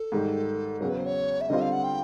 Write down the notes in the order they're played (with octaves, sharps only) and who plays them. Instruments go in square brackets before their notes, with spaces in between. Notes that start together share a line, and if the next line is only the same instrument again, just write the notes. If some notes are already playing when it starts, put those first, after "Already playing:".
Already playing: [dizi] A4
[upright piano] G#2 D#3 G3
[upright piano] E2 C#3 F#3 [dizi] A#4
[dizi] B4
C5
C#5
E5
[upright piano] D3 G3 C4 F4 [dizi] D#5
[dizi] F5
F#5
G5